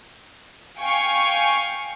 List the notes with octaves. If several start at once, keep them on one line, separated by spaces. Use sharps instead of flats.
F5 G5 G#5 C#6